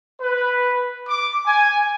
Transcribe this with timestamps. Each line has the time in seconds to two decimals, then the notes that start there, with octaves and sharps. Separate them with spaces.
0.20 B4
1.08 D6
1.46 G#5